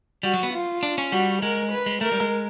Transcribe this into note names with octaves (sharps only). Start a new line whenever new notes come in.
G3 F#4
F#3
B3
F4
D4
C#4
G3 F#4
G#3 A#4
B4
G#3
A3 A#4
G3
G#3